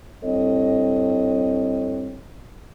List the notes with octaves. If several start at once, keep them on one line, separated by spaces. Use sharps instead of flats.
G2 C4 E4 A4 C#5 D#5